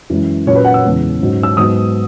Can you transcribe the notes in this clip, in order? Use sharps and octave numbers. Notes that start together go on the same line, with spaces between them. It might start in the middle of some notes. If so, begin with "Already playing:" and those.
F#2 E3 G#3
A#2 F#3 A#3 C#4 C#5
B4
F#5
E6
E2 C#3 G#3
G#2 F#3 C#4
E6
G#2 F#3 B3 D#6